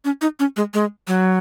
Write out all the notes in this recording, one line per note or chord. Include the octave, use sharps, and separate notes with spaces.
C#4
D#4
C#4
G#3
G#3
F#3